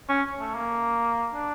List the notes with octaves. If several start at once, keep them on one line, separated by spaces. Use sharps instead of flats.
C#4
A3
A#3
D4